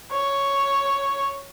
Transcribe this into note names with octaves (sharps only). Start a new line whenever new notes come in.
C#5